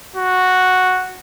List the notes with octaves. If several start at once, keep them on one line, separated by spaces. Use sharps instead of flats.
F#4